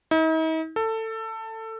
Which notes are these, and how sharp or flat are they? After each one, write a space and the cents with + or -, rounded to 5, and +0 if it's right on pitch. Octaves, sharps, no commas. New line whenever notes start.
D#4 +45
A4 +20